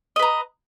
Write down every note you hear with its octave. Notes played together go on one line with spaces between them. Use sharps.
B4 D#5 A#5